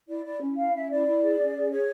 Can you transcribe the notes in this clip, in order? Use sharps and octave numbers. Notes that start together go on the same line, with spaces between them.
E4 D5
E4 D5
C#4
E4 F5
C#4 E5
E4 D5
E4
G#4
C#4
G#4
G#4 C#5